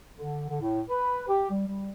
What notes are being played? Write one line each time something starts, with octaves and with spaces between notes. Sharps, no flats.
D3
D3
A2
B4
G4
G3
G3